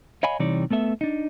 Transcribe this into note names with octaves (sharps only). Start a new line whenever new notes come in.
C#5 D#5 F5 G#5 B5
C3 E3 G3 D#4 C#5 D5
A3 B3 A4 E5
D4 D#4